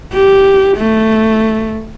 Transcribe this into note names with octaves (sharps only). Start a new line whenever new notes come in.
G4
A3